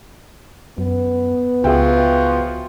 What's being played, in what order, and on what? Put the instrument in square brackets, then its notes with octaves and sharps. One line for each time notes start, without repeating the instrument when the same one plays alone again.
[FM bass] F#2 [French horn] B3
[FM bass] C#2 [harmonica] F3 F4 F#4 [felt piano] G#4 E5 G5